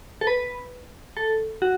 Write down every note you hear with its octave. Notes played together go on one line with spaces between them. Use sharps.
A4
B4
A4
F#4